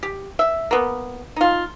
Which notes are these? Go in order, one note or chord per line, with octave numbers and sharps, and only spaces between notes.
G4
E5
A#3 B3
D#4 F4